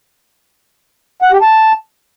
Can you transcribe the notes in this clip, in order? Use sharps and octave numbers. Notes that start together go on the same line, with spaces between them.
F#5
G4
A5